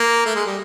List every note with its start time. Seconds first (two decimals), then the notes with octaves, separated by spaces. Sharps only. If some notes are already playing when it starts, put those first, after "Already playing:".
Already playing: A#3
0.26 A3
0.35 G#3
0.46 G3